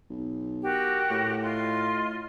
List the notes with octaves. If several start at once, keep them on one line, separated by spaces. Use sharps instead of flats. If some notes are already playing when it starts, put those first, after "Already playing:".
B1
F#4 G4 A#4
A2
F4 D#5 C6